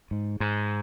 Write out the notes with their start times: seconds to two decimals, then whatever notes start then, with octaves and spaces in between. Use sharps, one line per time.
0.11 G#2
0.40 G#2